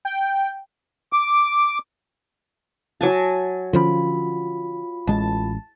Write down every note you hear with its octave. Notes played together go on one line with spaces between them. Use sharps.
G5
D6
F#3 G#5 A5
D3 F3 C#4 F4 B5
A1 G#3 A5